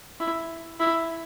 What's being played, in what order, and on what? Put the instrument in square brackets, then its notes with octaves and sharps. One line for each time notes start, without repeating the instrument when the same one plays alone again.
[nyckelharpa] E4
E4